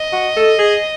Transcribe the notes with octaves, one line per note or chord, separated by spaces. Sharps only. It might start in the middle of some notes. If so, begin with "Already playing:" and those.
Already playing: D#5
F#4
A4
G#4